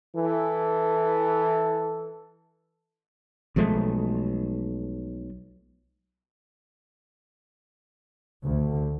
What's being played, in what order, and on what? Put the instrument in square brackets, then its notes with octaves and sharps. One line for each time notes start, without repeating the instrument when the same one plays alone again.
[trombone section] E3 A4
[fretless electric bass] B1 F3 G#3 A3
[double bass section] D2